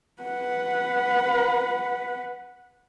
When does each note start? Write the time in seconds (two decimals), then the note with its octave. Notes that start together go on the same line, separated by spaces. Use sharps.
0.22 B4 F#5